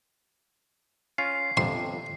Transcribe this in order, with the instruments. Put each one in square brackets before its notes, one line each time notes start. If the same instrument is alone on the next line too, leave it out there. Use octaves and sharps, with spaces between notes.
[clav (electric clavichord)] C#4 F4 F5 [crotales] C7
[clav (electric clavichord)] G1 F2 C3 [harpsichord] C6